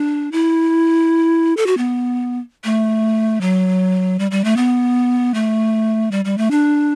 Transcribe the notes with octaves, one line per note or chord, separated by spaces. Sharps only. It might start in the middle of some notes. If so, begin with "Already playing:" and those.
Already playing: D4
E4
A4
F#4
B3
A3
F#3
G3
G3
A3
B3
A3
G3
G3
A3
D4